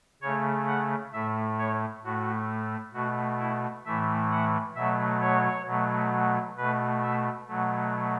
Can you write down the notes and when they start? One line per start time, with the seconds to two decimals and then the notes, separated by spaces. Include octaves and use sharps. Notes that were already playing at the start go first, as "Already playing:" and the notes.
0.22 C#3 A3 C#5
0.67 F#5
1.13 A2 A3 E5
1.59 C#5
2.03 A2 A3 F#4
2.94 B2 A3 F#4
3.39 E4
3.85 A2 E3 A3 E5
4.31 F#5
4.75 B2 F#3 A3 E5
5.21 C#5
5.65 B2 F#3 A3
6.57 B2 A3 B4
7.02 E5
7.47 B2 F#3 A3